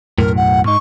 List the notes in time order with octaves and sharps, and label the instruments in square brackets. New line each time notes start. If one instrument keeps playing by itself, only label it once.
[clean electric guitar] B1 F#2 A2 [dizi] A#4
[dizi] F#5
[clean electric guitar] G#2 D#4 [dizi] C#6